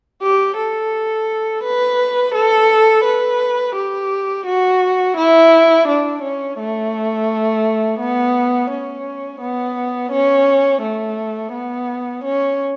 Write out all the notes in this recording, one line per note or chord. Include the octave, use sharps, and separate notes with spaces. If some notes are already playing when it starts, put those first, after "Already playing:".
G4
A4
B4
A4
B4
G4
F#4
E4
D4
C#4
A3
B3
C#4
B3
C#4
A3
B3
C#4